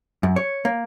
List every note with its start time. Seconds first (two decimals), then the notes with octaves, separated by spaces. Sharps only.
0.23 F#2
0.36 C#5
0.65 A#3